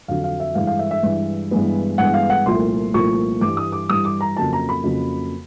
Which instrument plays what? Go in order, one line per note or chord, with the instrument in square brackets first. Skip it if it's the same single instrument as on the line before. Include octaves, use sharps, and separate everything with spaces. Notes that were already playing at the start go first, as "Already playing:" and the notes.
[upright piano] F2 D3 F#3 F5
F5
E5
G2 E3 G#3 F5
F5
E5
E5
G2 E3 G#3
G2 E3 G#3 B3
G2 E3 G#3 B3 F#5
F5
F#5
C2 A#2 F3 A3 C6
C2 A#2 F3 A3 C#6
G2 E3 G3 D6
D#6
D6
G2 E3 G3 D#6
D6
A#5
F2 C#3 F#3 A#3 A5
A#5
B5
F2 C#3 F#3 A#3